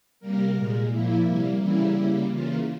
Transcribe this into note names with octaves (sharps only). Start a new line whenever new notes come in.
C3 G3 A#3 A#4
A#2 G#3
A#2 F3 A#3 E4
C3 G3 A#3
C#3 E3 G3 A#3 E4
C#3 G3 A#3
C#3 E3 A#3 F4